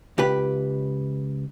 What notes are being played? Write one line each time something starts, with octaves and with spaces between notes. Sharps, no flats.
C#2 G4 B4